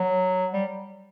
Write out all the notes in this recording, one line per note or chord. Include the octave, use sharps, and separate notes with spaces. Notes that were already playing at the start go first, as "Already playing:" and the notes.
Already playing: F#3
G3